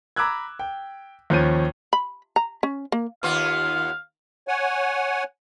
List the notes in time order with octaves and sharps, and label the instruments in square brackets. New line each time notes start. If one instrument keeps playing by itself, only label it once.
[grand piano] A#5 B5 D6 E6 F#6 G#6
G5
D#2 F3 C#4 G6 D#7
[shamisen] B5
A#5
C#4
A#3
[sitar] D#2 B3 F4 [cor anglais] F5
[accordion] C#5 F#5 G#5